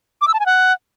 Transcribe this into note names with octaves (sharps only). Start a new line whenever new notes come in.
D6
E6
A5
G#5
F#5